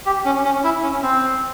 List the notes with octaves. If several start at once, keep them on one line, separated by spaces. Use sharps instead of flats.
G4
C#4
C#4
E4
C#4
C4